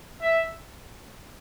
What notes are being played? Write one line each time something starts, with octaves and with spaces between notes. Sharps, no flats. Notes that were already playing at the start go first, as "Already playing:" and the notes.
E5